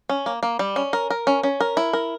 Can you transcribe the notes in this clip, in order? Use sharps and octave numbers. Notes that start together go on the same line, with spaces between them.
C#4
A#3
A#3
G3
C#4
A#4
A#4
C#4
C#4
A#4
E4
A#4